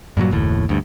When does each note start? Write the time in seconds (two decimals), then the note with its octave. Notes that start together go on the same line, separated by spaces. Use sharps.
0.17 G2 A#2 D#3 F#3
0.31 F#1 D#2 A2
0.69 D2 G2